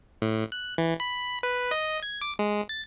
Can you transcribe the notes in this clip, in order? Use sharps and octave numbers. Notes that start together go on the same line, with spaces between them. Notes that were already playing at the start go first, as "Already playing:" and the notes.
A2
F#6
E3
B5
B4
D#5
G#6
D6
G#3
A6